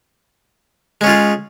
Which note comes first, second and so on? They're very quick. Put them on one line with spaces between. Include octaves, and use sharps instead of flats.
G#3 C#4 F4 G#4